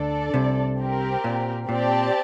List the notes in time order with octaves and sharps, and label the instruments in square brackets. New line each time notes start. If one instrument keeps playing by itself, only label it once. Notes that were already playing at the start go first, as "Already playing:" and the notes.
Already playing: [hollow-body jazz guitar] D2 D3 [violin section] D4 A4 D5
[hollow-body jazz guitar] C2 C3
[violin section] C4 G4 A#4
[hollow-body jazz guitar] A#2
[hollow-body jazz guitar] A#2 [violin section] C4 G4 D5 A5